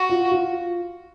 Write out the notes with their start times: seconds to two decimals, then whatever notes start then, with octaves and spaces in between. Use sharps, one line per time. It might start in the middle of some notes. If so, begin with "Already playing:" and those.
Already playing: F#4
0.09 F4
0.32 F4